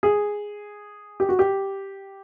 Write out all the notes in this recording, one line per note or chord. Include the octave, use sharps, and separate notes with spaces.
G#4
G4
F#4
G4